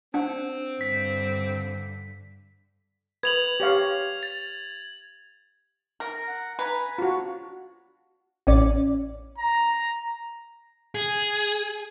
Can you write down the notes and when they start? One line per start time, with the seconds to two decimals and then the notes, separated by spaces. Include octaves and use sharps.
0.14 C4 D4 F#5
0.81 G2 D3 B6
3.23 B4 G#6 F7 F#7
3.60 G4 C#5 F5
4.23 A6
6.00 A#4
6.27 F#5
6.59 B4 G#5 A#5
6.98 D4 F4 F#4
8.47 A1 C#4 D5
9.38 A#5
10.95 G#4